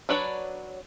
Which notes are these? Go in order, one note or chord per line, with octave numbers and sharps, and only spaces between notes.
F#3 D4 B4 C#5 D5